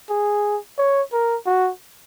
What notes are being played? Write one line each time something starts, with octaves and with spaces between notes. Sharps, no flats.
G#4
C#5
A#4
F#4